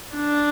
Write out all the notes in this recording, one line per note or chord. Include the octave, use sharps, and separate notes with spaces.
D4